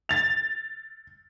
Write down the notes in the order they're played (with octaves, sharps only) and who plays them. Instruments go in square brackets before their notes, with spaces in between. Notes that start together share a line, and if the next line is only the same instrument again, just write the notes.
[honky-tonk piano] A6 F7